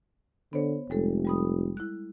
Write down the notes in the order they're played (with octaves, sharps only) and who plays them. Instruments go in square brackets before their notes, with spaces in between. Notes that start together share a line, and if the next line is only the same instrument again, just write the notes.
[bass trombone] D3 [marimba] B3 C5 C#5
[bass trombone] F1 [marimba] G3 G#3 A4
[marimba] G3 B5 D#6
E4 F#6